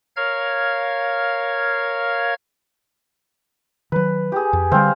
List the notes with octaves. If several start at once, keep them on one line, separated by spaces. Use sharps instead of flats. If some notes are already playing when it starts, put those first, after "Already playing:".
A#4 C#5 F5 F6 G#6
D#3 F#3 B4
G4 G#4
F2
D3 G3 C4 C5 F5